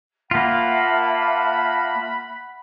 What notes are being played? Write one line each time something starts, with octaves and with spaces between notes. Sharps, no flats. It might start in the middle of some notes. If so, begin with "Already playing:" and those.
A#3 F4 E5 F#5 A5 B5 F6